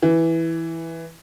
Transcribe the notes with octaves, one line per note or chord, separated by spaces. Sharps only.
E3